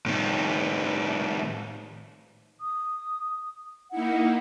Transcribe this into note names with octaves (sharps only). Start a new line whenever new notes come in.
A2 D#3
D#6
A#3 D#4 E4 F#5